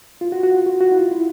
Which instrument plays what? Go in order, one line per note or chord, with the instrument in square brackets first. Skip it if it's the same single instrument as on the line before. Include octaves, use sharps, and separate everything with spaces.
[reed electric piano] F4
F#4
F#4
F4
F#4
F#4
E4
F4
E4